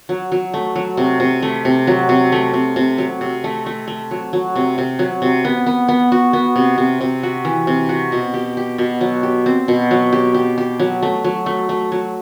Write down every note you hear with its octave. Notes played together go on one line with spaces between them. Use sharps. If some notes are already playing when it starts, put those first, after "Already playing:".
F#3
F#3
A3
F#3
C3
C3
A3
C3
F#3
C3
A3
C3
C3
F#3
C3
A3
A3
A3
F#3
F#3
C3
C3
F#3
C3
B3
B3
B3
F#4
B3
C3
C3
C3
F#4
E3
C3
F#4
B2
G4
G4
B2
F#3
G4
C4
B2
F#3
G4
G4
G4
F#3
A3
F#3
A3
A3
F#3